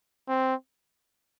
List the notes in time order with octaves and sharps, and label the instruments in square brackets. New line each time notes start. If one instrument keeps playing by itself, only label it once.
[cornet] C4